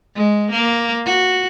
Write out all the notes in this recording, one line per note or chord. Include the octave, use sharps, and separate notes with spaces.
G#3
A#3
F#4